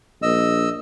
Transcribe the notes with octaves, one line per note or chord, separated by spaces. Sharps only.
A#1 D#5 E6